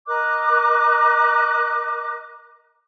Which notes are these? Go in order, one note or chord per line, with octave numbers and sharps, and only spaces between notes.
A#4 D#5 D6 F#6